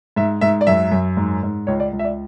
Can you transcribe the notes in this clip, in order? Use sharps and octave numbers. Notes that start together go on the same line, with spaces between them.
G#2 E5
G#2 E5
D5
F#2 E5
F#2
G#2
G#2
C#2 C#5
D5
C#2
E5
D5